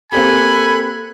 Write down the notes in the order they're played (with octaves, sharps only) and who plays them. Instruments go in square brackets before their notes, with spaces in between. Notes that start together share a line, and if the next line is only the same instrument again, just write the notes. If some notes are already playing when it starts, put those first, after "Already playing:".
[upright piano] A#3 C4 G4 [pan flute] A4 [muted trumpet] G#5 [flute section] B5 F#6